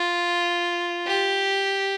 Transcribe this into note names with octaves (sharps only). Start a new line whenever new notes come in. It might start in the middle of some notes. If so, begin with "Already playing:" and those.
Already playing: F4
G4